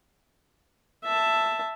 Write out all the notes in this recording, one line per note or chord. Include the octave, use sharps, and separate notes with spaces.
E5 A5